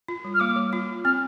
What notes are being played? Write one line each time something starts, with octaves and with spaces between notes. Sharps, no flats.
F4
G3
F6
A#3 D6
G3
F4
C4 F6